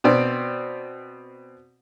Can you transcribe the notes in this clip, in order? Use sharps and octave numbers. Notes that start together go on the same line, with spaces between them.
B2 C4 D5